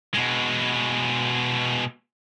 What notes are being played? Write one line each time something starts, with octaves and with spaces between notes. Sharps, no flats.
B2 G#3